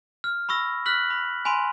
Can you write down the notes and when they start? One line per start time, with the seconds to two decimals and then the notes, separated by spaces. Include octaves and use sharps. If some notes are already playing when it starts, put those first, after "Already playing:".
0.24 F6
0.49 B5 C#6 E6 A#6
0.86 F6 F#6 B6 F#7
1.10 B5
1.45 G#5 B5 C6 D#7